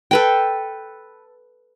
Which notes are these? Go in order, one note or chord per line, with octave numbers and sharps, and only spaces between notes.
A4 B4 G5